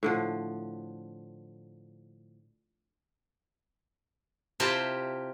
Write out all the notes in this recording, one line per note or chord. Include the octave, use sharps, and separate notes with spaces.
A2 D3 F3
C3 E4 F4 G4 C5 A5